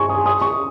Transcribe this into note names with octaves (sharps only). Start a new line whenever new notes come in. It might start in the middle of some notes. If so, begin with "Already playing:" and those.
Already playing: G#5 C6 C#6
D#6
D#6
C#6